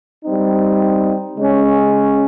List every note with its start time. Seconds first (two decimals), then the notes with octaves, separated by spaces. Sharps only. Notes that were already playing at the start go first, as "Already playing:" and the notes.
0.24 G3 C4 D#4
1.37 C#3 G#3 C#4